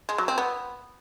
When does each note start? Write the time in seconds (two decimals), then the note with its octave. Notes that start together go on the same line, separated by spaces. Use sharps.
0.09 G#3
0.18 F#3
0.28 C4
0.38 B3